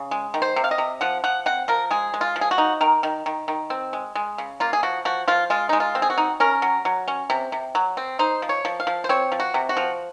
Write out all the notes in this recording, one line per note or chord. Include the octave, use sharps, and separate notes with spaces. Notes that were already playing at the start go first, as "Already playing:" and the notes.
Already playing: C#3
G#3
D#3
C5
C3
F5
D#5
C3
F3 F#5
F3 F#5
C4 F#5
F3 A#4
G#3 G#4
G#3
F4
F3
G#4
F#4
D#4
D#3 A#4
D#3
D#3
D#3
C4
G#3
G#3
C#3
A#3 F4
G#4
F3 F#4
F3 F#4
F3 F4
G#3 F4
G#3 D#4
F4
C4
G#4
F#4
D#4
C#4 A#4
F#3
F#3
C#4
C3
C3
F#3
C4
D#4 C5
F3
C#5
F3
F5
F3
C5
C4 C#5
F3
F#4
C3
F#4
F3